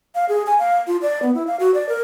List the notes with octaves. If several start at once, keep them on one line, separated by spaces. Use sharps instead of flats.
F5
G#4
G#5
F5
F4
D5
B3
E4
F5
F#4
D5
A#4